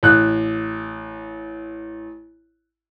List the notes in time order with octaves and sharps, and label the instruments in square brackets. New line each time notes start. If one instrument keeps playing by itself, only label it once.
[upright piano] A1 F#6